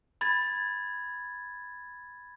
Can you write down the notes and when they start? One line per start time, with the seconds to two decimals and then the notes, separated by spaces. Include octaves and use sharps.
0.21 B5 G#6 A6